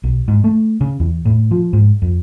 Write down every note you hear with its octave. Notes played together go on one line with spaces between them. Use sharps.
B1
G#2
A3
C#3
E2
A2
F3
G#2
F2